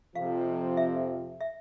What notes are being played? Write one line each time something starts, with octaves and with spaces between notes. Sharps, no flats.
F2 C3 F3 F5
E5
E5